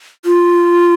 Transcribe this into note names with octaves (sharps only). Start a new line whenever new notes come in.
F4